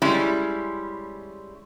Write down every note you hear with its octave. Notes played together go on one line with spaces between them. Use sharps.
G3 G#3 C#4 E4